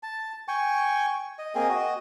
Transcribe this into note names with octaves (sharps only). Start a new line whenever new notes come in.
A5
G5 G#5 C#6
D#5
A#3 C4 G#4 D#5
F#4 D#5